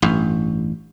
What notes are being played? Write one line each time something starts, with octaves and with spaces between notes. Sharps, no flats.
A1 G2